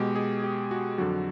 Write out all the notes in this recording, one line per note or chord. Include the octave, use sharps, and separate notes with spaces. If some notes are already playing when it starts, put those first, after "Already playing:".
Already playing: B2 G#3 G4
G#4
G4
F#4
F2 D3 F#3 F#4